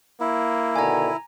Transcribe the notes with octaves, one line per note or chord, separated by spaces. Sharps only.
A#3 E4
B2 D3 D#3 G#5 A#5